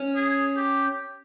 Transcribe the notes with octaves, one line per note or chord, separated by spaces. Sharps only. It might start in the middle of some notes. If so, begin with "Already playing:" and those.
Already playing: C#4
G#4
G4